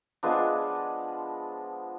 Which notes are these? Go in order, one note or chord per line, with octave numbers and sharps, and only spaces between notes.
F3 G#3 B3 D4